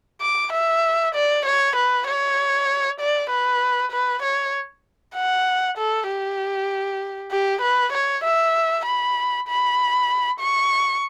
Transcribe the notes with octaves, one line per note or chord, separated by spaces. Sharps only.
D6
E5
D5
C#5
B4
C#5
D5
B4
B4
C#5
F#5
A4
G4
G4
B4
C#5
E5
B5
B5
C#6